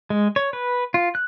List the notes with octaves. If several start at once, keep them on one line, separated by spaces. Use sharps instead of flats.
G#3
C#5
B4
F4
F#6